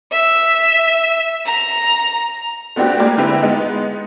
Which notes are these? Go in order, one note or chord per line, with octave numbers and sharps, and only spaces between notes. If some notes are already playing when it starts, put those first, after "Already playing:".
E5
A#5
A3 B3 C4 D4 F#4 G4
G#3 A#3 G4 G#4 D5
D3 C4 E4 G4 B4
G#3 B3 D#4